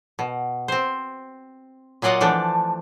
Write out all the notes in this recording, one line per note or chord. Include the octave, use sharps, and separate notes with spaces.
B2
C4 C5
A#2 F#3 F4 D5 D#5 F#5
E3 F3 A3 D4